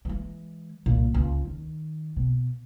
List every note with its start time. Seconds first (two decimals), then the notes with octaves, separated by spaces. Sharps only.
0.05 E3 G#3
0.86 C2 A#2
1.14 C#2
1.45 D#3
2.16 B2